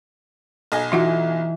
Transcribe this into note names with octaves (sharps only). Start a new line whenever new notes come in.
B1 D#5 G#5
E3 D#4 F4 F#4 F#5